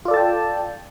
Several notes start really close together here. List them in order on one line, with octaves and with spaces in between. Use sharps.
F4 D5 A4 A5 G5